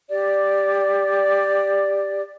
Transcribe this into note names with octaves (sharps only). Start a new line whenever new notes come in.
G4 D5